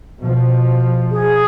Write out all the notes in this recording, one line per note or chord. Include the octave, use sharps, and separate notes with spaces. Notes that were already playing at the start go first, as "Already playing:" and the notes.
B2 F3
G#4